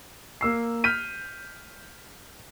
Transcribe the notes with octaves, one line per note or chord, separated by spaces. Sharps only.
A#3 E6 C7
F6 G6 B6 D#7